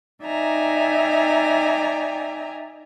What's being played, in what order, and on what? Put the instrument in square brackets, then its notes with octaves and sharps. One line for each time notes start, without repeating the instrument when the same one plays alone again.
[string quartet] D#4 D5 E5 G5 G#5 A#5